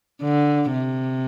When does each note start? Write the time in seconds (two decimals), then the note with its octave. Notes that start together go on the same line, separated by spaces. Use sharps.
0.22 D3
0.73 C3